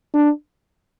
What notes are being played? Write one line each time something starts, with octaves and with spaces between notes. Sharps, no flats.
D4